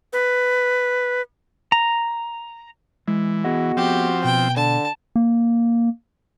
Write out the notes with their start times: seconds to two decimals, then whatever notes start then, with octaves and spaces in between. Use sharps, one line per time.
0.13 B4
1.72 A#5
3.08 E3 G#3
3.44 B3 F#4 G#4 D#5
3.77 F3 C4 G4
4.24 B2 G5
4.57 D3 A5
5.16 A#3